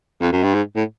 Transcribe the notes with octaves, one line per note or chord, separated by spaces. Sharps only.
F2
F#2
G2
G#2
A2